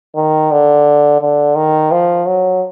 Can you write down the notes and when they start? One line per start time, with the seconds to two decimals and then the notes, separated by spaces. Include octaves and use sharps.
0.16 D#3
0.52 D3
1.21 D3
1.56 D#3
1.92 F3
2.27 F#3